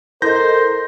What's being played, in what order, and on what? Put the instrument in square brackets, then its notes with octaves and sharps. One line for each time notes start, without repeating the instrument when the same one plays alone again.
[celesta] E4 A4 D#5 [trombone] A#4 [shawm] C5 [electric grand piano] G6 A#6